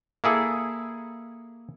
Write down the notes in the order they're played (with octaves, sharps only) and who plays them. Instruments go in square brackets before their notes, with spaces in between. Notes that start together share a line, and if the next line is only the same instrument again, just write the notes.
[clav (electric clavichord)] A#3 E4 G#4 A4